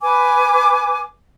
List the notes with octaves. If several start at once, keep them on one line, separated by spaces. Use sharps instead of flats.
B4 G#5 D6